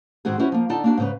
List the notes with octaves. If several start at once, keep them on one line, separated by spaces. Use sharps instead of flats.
G#2 D#3 G#3 C4 F#4 G#4
G3 C#4 E4 F#4 C5
F3 A#3
D3 D#4 D5 A5
A#3 D4 F#4
G#2 C#3 B4